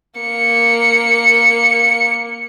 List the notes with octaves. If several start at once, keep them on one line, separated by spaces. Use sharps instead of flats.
A#3 C#7